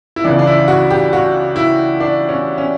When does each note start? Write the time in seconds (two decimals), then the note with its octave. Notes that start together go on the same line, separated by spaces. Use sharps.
0.16 E4
0.24 C#2 C#3 E3 D4
0.39 D4
0.47 E4
0.68 F#4
0.90 G4
1.13 F#4
1.56 E4
2.00 D4
2.29 C#4
2.58 C#4